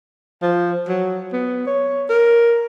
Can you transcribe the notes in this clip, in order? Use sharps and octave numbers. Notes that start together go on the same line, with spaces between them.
F3
F#3
B3
C#5
A#4